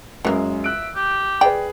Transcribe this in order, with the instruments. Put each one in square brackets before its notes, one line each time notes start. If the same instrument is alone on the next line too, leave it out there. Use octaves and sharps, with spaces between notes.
[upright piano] F#2 G#3 C#4 [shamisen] E3 A#3
[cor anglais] E5 [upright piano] F#6 D7
[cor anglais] G4
[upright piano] G#4 B4 [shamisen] D5 G5